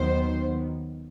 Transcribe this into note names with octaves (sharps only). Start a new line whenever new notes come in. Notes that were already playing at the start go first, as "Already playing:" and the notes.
Already playing: D#2 D#3 F#3 B3 C5